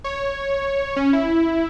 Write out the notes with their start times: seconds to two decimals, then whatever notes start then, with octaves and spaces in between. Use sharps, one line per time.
0.04 C#5
0.96 C#4
1.13 E4